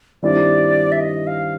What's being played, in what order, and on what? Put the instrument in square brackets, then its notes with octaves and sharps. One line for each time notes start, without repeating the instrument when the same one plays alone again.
[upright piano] G2 D#3 G3 C4 E4 [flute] D5
[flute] E5
D#5
F5